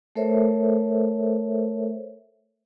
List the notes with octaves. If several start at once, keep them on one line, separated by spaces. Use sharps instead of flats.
A3 A4 A#4 C5 C#5 E5